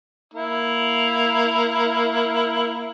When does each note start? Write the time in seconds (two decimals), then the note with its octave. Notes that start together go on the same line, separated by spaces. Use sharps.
0.34 A#3 E4